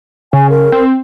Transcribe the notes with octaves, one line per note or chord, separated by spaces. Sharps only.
C#3 G#5
A#4
C4